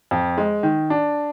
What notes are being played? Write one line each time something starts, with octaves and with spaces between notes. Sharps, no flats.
F2
G#3
D#3
D4